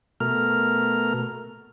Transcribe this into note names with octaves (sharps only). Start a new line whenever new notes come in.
B2 A3 A#4 F6